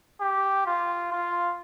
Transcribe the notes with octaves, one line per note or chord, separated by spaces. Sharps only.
G4
F4
F4